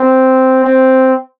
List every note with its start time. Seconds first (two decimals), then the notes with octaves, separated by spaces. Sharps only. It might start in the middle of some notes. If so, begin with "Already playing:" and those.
Already playing: C4
0.64 C4